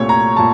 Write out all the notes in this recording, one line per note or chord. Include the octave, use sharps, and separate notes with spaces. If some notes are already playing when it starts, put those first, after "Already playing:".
Already playing: C2 A#2 A3 C#5
A#5
A#2 A5